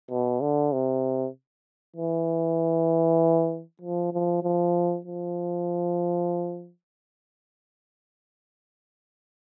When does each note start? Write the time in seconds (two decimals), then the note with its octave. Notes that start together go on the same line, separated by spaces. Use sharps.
0.11 B2
0.42 D3
0.73 C3
1.96 E3
3.82 F3
4.13 F3
4.43 F3
5.05 F3